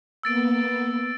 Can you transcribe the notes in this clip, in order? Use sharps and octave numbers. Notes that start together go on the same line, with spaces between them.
A#3 B3 E6 A6 D7